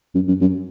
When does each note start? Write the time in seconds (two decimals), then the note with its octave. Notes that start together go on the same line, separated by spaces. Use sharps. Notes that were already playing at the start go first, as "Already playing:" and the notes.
0.15 F#2
0.28 F#2
0.41 F#2